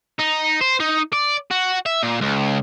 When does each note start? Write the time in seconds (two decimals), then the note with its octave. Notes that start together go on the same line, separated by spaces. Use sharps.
0.19 D#4
0.61 C5
0.80 D#4
1.13 D5
1.51 F#4
1.86 E5
2.03 A#2
2.21 C#2